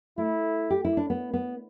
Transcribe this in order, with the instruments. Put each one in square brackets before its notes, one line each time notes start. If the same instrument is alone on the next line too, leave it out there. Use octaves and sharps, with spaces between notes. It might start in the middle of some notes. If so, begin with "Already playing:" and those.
[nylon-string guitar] A3 [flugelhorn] E4
[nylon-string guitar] G4
E4
D4
B3
B3